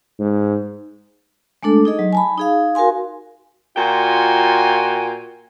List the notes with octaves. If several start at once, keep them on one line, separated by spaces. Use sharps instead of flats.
G#2
G#3 A3 D4 A4
D#4 G#4 D#5
F#3
G#5 A5 B5
D#4 G#4 F5
F#4 A#4 F5 G#5 C6
A#2 F4 F#4 G5 G#5